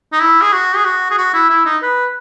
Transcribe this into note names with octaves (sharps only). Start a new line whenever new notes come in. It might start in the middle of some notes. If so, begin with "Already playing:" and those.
D#4
E4
G#4
F#4
G#4
F#4
G#4
F#4
E4
E4
D#4
B4